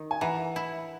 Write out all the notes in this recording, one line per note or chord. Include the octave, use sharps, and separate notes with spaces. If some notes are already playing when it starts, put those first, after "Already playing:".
Already playing: D#3
G#5
E3 F#5 A#5
E4